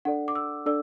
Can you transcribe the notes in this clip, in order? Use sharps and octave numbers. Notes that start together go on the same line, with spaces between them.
D4 A4 D5 F#5
D6
E6
D4 A4 D5 E6